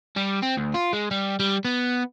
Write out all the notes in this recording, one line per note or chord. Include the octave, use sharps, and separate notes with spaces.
G3
C4
D2
F4
G#3
G3
G3
B3